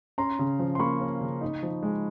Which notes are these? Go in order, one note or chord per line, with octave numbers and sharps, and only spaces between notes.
C#4 A#5 C6
C#3
F3
C6
A#3 B5 C#6
C#4
C#3
D#4
F3
G#3